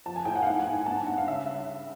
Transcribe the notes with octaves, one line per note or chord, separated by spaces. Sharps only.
F3 A5
G#5
A2 G5
F#5
F5
G#2 F#5
G#5
G#2
G#5
G2 A5
G2 F#5
F5
C#3 E5